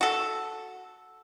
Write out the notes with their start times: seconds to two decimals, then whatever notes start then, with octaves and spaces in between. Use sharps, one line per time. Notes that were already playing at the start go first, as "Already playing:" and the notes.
0.01 F#4 A4